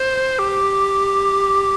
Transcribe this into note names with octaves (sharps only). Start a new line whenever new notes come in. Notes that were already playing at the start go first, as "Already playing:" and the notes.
Already playing: C5
G4